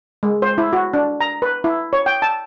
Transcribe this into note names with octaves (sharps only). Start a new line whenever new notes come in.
G#3
C5
E4
F#4
D4
A#5
B4
E4
C#5
G5
A5